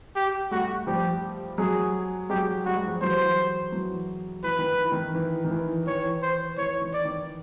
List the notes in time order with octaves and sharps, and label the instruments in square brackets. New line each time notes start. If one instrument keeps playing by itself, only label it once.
[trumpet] G4
[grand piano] G3 A3 [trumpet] F#4
[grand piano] F3 G3 [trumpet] G4
[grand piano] F#3 G#3 [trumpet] G#4
[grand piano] F#3 G#3 [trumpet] G4
[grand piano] G3 [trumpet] F#4
[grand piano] G#3
F3 G3
[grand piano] E3 F#3 [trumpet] C5
[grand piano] E3 F#3
[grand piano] E3 [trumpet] B4
[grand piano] D#3
E3
D#3
E3
D#3
E3
[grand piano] E3 [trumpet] C#5
[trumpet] C5
[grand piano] E3 [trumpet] C#5
[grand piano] D#3
[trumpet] D5
[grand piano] D#3